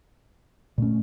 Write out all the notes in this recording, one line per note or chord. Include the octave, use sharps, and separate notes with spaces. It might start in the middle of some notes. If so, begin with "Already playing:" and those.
A#2 A3 C#4